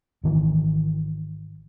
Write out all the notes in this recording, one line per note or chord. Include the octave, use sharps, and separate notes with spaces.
G#1 D#3 E3